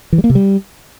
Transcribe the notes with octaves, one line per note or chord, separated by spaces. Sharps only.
E3
G3
A#3
C3
G3